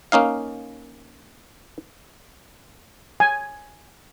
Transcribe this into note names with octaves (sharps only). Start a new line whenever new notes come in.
A#3 C#4 D#4 F5
G#5